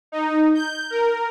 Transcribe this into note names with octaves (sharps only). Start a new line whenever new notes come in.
D#4
G6
A#4